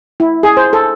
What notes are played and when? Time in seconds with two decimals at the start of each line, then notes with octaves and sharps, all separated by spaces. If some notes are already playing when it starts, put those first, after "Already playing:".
0.20 E4
0.43 G#4
0.57 C5
0.73 A4